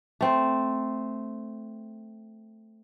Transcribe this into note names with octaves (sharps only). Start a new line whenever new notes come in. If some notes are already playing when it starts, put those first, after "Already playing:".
A3 C4